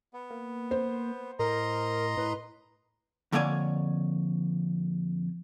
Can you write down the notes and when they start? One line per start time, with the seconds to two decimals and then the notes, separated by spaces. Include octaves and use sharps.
0.13 B3
0.31 A#3
0.71 C5
1.39 A2 A#4 D#5 A#5 C6
2.17 A2 B4
3.32 F2 D3 A#3 C#5 D5 G#5